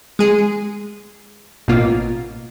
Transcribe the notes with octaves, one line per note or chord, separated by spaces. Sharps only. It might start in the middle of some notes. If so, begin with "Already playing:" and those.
G#3 G#4
A1 B2 A#3 F4